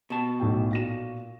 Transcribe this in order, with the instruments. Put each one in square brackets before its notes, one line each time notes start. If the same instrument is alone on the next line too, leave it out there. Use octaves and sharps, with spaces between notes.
[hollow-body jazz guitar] B2 A5
[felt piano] B1 A2 G5
A#2 A#6 E7